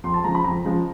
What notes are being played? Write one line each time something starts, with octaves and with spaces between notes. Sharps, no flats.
F2 C6
A5
C#3 F3 G#3 A#5
B5
F2 A#5
C#3 F3 G#3